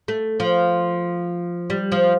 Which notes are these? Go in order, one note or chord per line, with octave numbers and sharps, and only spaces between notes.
A3
F3
G3
F3